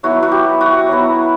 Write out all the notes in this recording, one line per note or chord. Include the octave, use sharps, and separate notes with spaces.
F#3 B3 E4 F#4
F#4
G4
F#4
F#3 B3 E4